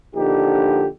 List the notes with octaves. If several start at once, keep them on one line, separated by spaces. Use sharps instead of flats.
A#1 D3 D#4 G4